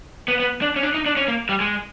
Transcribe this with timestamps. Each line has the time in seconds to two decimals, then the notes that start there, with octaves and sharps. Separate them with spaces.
0.28 B3
0.40 B3
0.62 D4
0.76 C#4
0.83 D4
0.94 D#4
1.06 D4
1.17 C#4
1.28 A#3
1.49 G3
1.60 G#3